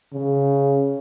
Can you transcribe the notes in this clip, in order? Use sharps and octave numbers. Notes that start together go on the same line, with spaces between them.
C#3